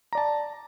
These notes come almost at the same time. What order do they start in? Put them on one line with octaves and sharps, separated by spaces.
A#5 D5 A5